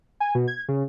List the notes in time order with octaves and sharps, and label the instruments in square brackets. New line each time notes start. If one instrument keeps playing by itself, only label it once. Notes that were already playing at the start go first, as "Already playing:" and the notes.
[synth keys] G#5
B2
G#6
C#3